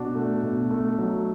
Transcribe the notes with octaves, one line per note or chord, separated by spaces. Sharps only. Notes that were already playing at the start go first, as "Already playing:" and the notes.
Already playing: B2 D4 F#4
A3
B2
A3
F#3